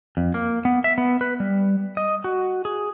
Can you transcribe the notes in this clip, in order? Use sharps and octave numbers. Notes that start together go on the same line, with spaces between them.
F2
A#3
B3
E5
B3
B4
G3
D#5
F#4
G#4